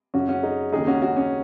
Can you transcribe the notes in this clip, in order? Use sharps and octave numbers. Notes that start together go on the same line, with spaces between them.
F#2 C#3 C#4 F#4
C#4 F#4
D#4 G#4
D#2 C#3 D#4 G#4
C#4 F#4
C#4 F#4
C#4